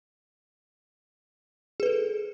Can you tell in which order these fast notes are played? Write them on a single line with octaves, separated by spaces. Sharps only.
G#4 B4 A4